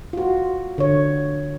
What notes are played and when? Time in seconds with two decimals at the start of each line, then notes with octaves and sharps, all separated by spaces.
0.13 F4 F#4
0.78 D3 C#5